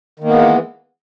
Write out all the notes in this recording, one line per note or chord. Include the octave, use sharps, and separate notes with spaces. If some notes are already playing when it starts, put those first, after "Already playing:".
D#3 E3 G#3 A#3 B3